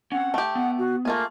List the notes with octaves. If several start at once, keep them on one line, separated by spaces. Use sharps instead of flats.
C4 C#4 F#5
A3 G4 G5
B3 F#5
F#4
A3 A#3 F4 G#4